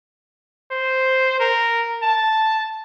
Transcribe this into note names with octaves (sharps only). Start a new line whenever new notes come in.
C5
A#4
A5